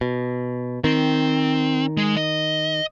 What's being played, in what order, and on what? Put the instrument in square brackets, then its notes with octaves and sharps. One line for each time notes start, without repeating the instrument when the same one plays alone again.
[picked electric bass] B2
[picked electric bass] D#3 [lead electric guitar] C4
[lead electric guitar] G#3
D#5